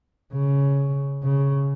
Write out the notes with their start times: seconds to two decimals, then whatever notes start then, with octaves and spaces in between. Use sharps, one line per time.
0.32 C#3
1.23 C#3